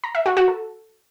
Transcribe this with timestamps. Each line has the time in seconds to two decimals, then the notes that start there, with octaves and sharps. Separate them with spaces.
0.04 A#5
0.15 E5
0.26 F#4
0.37 F#4
0.48 A4